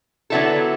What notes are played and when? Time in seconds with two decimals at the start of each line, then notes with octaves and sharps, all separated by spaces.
0.30 D3 F#3 B3 E4 A4